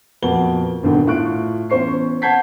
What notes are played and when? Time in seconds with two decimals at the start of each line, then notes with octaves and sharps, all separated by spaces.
0.22 F2 A#2 A#3 B3 F#4 G7
0.83 G#1 G2 B2 D3 D#3
1.07 A2 F4 C#6 F#6 D7
1.70 E2 C#4 C5 C#6 C7
2.22 F#5 A5 G6 G#6 B6 C7